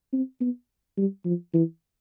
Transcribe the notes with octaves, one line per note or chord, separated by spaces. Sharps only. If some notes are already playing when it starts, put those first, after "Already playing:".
C4
B3
G3
F3
E3